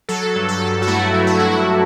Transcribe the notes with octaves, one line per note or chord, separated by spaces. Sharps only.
F#3 A4
G2
A4
G2
F#4
A3 E4
F#3
F#4
G2 E4
F#4